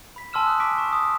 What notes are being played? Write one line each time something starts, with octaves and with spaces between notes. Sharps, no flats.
B5 B6
G#5 A5 C6 E6 F6 E7
D#6 E6 F#6
G#5 D6 B6 D7
C#6 E7
D#6